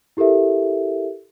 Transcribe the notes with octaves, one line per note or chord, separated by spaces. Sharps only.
E4 G4 A4 A#4 E5